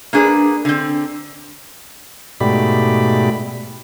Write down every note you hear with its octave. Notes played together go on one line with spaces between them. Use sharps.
A#3 D4 G#4 A4 B4
D3 C4
G#2 B2 A3 G4 D5 B5